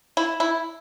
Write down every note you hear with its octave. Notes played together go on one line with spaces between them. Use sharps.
E4
E4